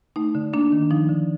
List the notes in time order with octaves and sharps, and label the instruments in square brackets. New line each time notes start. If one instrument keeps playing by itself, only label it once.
[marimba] A3 D#4
D3
A#3 D4
D#3
F3 D#4
D3